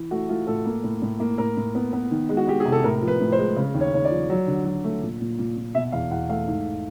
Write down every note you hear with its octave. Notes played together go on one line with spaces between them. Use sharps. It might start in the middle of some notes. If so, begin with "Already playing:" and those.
Already playing: E3
A3 F#4
A3 F4
A2 A4
A#3
A2
A2
A#3
A2 A#4
A2
B3
B3
D#3
G#3
F#4
G#3 G4
G#4
C3
A4
A2 A#4
F3
B4
A2
C5
G#3
C#3
D#2
C#5
D#2 C#5
D5
F3
F#3
D3
F#3
A3
A#2
A#2
A#2
A#2
B2 E5
E2 F5
E2 F#5
A3 F5
G#2